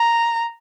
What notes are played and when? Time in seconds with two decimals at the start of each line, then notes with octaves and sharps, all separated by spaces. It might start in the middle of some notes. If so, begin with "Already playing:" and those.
Already playing: A#5